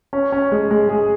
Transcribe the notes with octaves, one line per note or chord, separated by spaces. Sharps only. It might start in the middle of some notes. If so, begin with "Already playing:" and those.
C#4
C#4
G#3
G#3
G#4